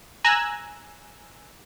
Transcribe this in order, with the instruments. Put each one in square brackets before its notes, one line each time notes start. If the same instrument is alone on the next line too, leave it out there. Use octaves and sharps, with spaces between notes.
[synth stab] G#5 A#5 E6 F#6